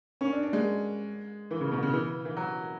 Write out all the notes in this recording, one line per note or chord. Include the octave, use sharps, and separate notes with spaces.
C#4
D4
D4
G#3
E3
C#3
B2
C#3
E3
E3
F#3